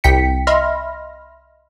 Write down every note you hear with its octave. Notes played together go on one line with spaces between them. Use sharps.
C2 G5 B6 C#7
D#5 E5 B5 C6 F6 A#6